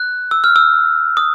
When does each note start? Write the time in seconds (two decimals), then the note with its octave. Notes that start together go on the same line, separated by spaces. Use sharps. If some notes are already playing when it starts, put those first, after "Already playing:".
Already playing: F#6
0.31 E6
0.44 F6
0.56 E6
1.17 D#6